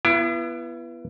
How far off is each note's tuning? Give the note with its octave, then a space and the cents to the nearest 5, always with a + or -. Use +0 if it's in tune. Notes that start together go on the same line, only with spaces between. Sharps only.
B3 -10 E4 +35